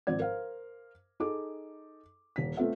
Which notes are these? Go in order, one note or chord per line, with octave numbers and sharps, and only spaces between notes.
G#1 F3 C4 D5 G#6
A#4 C5 F5
D#4 G#4 A4 D6
D#1 B6
A3 B3 C4 F4 A4 E5